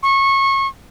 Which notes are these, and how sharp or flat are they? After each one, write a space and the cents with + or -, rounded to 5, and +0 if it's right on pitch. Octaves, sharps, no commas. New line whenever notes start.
C#6 -25